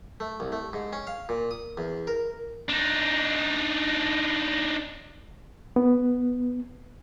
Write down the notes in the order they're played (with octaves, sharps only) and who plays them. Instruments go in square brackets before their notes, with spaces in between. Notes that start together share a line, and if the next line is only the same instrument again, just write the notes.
[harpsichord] A3
C2
A3
G#2
C#4
F5
A#2
D#6
E2
A#4
[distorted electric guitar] D4 D#4
[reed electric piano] B3